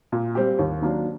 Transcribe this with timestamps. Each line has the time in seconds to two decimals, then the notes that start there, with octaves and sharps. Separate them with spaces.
0.12 A#2
0.35 G3 C4 G4
0.59 D#2
0.82 D#3 F#3 A#3 D4